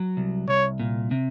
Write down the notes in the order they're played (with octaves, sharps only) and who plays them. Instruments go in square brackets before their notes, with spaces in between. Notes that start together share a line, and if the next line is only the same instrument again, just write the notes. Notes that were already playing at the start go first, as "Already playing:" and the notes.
Already playing: [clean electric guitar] F#3
C2
[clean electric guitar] C2 [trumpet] C#5
[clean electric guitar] A#2
C3